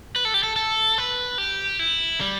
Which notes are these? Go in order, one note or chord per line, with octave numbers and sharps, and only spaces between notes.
B4
A4
G4
A4
A4
B4
G4
E4
G3